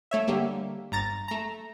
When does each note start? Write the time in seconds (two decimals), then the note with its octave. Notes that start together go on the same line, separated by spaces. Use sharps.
0.11 A3 C#5 E5
0.28 D3 G3 A#3
0.92 G1 A#5 A6 A#6
1.28 A3 A#5